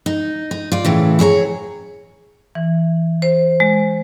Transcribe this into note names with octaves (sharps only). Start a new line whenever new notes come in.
D#4
D#4
F4 D5
A2 C#3 E3
E4 G#4 C#5 A#5
E3
C5
G#3